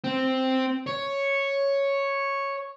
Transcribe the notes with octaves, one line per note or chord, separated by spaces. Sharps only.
C4
C#5